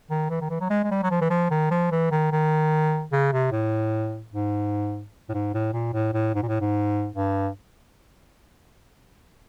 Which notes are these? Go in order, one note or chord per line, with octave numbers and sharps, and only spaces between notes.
D#3
E3
D#3
E3
F#3
G#3
G#3
G3
F#3
F3
E3
F3
D#3
F3
E3
D#3
D#3
C#3
C3
A2
G#2
A2
G#2
A2
A#2
A2
A2
G#2
A#2
A2
G#2
G2